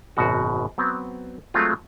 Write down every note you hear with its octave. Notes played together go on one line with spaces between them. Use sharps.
G#1 F#2 B2 F#4
F#3 B3 C4
F#3 G#3 A3 C4 F4